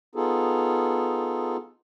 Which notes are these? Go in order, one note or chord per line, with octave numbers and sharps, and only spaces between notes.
B3 D#4 F4 G#4 A4